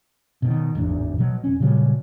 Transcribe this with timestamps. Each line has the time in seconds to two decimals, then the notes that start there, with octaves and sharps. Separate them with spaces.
0.42 B2 D3 D#3
0.75 D1 G#1 E2 D4
1.18 B2 F#3
1.44 E1 C#4
1.60 A#2 C#3 F#3 G3